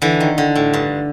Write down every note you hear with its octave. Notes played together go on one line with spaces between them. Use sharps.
D3 E3
D#3
D3
A2
G2